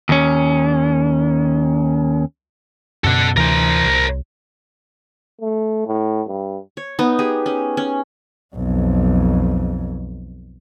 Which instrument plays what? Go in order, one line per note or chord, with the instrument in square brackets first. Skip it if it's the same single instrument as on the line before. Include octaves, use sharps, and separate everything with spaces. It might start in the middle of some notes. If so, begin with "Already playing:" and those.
[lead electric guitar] D#2 C#4
[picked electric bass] F#2 B2 [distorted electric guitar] A4 F#5
[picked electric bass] D2 C3 E3 [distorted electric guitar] A#4 C5
[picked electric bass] C2
[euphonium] A3
A2
G2
[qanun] C#5
B3 D#4
G4 G#4
C#4
C#4
[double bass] B1 F2